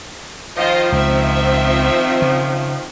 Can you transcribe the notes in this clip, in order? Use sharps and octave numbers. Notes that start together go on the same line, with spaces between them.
D#3 F3 F4 C5 D#5
C#2 C4 E5
C#3